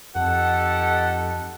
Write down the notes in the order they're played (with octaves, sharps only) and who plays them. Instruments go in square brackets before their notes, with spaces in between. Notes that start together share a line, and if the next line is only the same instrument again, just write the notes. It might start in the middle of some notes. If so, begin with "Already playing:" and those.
[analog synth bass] F2 [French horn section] D#4 G4 A4 [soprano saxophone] F#5